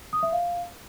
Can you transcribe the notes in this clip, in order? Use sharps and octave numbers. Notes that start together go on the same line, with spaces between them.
D#6
E5
F5